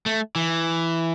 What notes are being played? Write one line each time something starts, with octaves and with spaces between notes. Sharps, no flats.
A3
E3